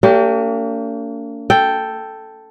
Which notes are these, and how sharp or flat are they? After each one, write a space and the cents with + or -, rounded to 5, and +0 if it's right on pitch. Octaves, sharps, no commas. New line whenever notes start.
A#3 -40 D4 -45 G4 +0
A4 +0 G5 +0